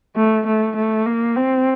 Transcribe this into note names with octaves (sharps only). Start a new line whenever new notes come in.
A3
A3
A3
A#3
C4